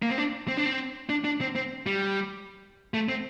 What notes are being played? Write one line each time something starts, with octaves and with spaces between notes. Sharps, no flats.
A#3
C4
D4
C4
D4
C4
D4
D4
C4
C4
G3
A3
C4